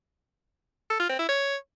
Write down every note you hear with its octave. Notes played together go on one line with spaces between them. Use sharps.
A4
F4
C4
E4
C#5